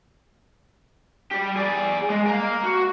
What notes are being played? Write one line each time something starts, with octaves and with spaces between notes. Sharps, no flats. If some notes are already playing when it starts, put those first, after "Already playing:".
G3 G4
G#4 D5
G#3
A#4 F5
F#4